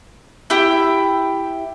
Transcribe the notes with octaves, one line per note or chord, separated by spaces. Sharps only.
E4 G4 G5